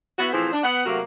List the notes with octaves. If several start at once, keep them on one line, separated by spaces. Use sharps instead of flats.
B3 E4 F#4
A2 E3 F3 C4 G#4 C5
D4
B3 F#5
C3 F#3 A3 A#3 F#4 A#4